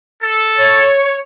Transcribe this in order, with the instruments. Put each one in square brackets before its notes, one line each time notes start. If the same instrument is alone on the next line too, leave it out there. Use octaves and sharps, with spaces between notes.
[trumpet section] A4
[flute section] C#5